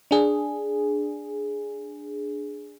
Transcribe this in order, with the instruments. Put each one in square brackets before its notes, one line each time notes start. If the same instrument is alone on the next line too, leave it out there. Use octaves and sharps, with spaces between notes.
[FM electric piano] D4 G#4